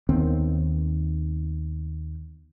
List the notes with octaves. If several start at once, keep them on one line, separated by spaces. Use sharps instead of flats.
D#2 D#3 B3 C4